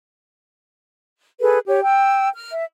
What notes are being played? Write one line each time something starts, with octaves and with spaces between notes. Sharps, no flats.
G#4 A4 B4
G4 C#5
G5 E6
F6
E5